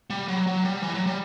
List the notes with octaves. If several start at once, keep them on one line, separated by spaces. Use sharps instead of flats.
G3
F#3
F#3
G3
E3
F#3
G3